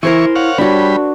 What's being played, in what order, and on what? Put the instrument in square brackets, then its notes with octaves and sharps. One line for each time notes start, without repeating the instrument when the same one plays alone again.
[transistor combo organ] E3 C#6 [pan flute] E4 [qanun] A#4 C5 G#5
[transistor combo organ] C#5 F5 F#5
[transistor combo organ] G3 B5 [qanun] D4 F#4 [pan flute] C#5